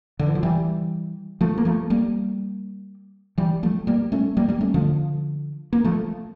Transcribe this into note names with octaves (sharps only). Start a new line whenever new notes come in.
D3
E3
F3
E3 G3
F3 A3
A#3
F3 A3
G3 A#3
E3 G3
F3 A3
G3 A#3
A3 C#4
G3 A#3
G3 A#3
A3 C#4
D3 F3
A#3
F3 A3